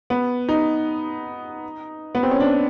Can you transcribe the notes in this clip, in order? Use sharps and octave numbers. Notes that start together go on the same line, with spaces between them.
B3
D#4
B3
C4
C#4
D4